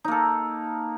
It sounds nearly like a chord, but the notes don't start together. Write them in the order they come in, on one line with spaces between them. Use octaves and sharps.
D#4 A#3 A4